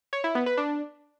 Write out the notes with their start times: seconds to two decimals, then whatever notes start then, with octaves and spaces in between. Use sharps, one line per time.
0.13 C#5
0.24 E4
0.35 B3
0.46 B4
0.57 D4